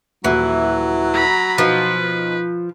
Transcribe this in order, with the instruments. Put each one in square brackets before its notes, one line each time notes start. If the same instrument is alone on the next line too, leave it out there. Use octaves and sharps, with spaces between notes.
[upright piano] D#1 F#4 [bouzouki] E3 [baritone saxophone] F#3
[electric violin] A#5 B5
[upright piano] B2 B3 D#4 [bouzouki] F3 [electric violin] B4